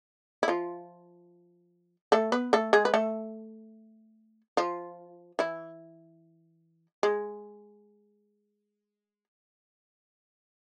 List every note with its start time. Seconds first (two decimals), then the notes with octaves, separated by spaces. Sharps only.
0.43 E4
0.48 F3 F4
2.12 A3 A4
2.32 B3 B4
2.53 A3 A4
2.73 G#3 G#4
2.85 B4
2.94 A3 A4
4.57 F3 F4
5.39 E3 E4
7.03 G#3